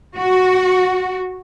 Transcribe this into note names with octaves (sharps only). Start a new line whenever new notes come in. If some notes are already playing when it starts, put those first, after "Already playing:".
F#4